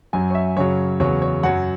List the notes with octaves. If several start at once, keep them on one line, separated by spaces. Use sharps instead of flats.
F#2 F#3 G#5
C#5
E5
F#2 C#3 F#3 C#5
E2 C#3 F#3 C#5
C#5
F#2 F#3 F#5